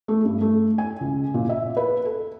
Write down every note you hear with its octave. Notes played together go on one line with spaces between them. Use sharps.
A3
G2
A3
G#5
C#2
A#2
E5
B4
A4